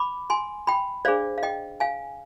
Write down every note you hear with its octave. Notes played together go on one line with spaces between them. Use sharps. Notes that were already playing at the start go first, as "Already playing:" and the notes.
Already playing: B5 D6
G#5 C6
G5 B5
D4 G#4 C5 D5 F5
F5
D#5 G5
F5 G#5